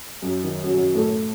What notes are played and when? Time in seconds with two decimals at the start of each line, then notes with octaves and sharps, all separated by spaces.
0.22 F#2 F#3
0.44 D#3
0.63 F#2 F#3
0.74 F#2 F#3
0.95 A2 A3